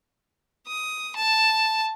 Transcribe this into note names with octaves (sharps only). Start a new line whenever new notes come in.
D#6
A5